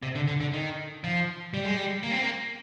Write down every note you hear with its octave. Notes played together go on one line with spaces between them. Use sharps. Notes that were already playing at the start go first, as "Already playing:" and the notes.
C3
D3
D3
D3
D#3
F3
G3
G#3
G3
A#3
C4
A#3